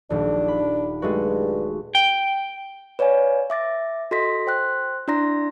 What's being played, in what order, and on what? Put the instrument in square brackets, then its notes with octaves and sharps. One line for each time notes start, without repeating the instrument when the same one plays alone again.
[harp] D#1 A#1 [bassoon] D4
[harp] B5
[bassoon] G2 [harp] G#3 A3 F#4
[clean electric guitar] G5
[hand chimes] B4 C#5 D5 F5 G#5
E5 D6 A6 A#6
F#4 A4 D#5 C6 A#6 B6
C5 G5 C6 F#6
D4 E4 D5 A#5 C6 A#6